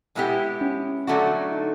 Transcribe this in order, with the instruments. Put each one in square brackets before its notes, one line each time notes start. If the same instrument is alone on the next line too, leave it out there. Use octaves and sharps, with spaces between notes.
[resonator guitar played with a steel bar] B2 G#3 B3 E4 G4
[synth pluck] C#4
[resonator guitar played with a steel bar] D3 F#3 A3 D4 F#4
[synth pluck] D#4